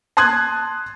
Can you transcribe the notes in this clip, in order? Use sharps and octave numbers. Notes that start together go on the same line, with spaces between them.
A5 C6 D#6 F#6 G#6